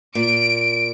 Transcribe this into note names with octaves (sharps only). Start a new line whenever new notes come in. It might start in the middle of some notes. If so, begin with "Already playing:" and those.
A#2 D7